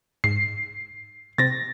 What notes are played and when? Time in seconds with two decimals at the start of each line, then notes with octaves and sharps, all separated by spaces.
0.24 G#2 C7
1.38 C3 C4 A6 A#6